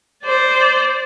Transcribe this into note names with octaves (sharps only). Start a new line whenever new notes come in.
C5 D5